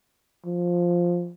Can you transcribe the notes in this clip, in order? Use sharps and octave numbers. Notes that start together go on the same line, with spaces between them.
F3